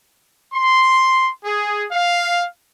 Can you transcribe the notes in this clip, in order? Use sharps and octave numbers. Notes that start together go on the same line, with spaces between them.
C6
G#4
F5